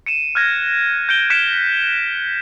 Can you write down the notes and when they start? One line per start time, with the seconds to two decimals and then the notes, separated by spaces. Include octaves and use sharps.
0.06 C#7 D#7 E7
0.35 F6 F#6 G#6 A#6
1.09 G6 C#7 D7 G7
1.30 F#6 B6 C#7 D7 E7